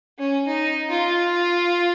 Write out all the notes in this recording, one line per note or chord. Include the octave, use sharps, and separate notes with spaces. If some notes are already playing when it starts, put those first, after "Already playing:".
C#4
D#4
F4